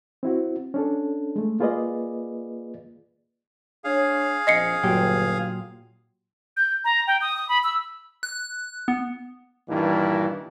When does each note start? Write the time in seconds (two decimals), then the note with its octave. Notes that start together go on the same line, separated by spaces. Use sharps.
0.23 C4 E4 F#4
0.74 C#4 D4 A4
1.36 G#3 A3
1.60 A#3 F4 G#4 B4 D5 D#5
3.84 D4 G#4 C#5 F5
4.47 A#1 C4 D#5 C7 C#7
4.83 G1 A#2 F#3 G4
6.57 G6
6.85 A#5
7.07 G5
7.21 D#6
7.37 D#6
7.49 B5
7.64 E6
8.23 F#6
8.88 B3
9.69 G2 A#2 D#3 E3